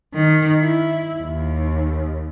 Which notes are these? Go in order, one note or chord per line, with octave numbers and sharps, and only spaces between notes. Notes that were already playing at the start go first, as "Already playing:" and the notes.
D#3
E4
D#2